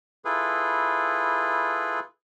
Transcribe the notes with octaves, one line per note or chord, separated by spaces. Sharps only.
E4 F4 G#4 A4 B4